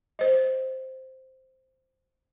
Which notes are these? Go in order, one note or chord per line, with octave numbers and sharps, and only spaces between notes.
C5 D#5